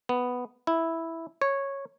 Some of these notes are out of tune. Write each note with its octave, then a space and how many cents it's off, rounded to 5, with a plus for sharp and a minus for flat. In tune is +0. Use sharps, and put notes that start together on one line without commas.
B3 +5
E4 -5
C#5 -10